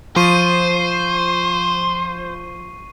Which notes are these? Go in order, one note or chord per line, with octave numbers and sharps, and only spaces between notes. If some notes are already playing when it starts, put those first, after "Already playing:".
F3 C5 C#6 C7 D#7